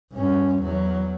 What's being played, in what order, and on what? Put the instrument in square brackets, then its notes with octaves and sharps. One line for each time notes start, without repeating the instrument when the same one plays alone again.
[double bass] G2 C#4
E2 F#3